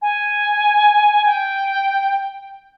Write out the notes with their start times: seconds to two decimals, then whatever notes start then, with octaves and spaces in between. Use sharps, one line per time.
0.02 G#5
1.26 G5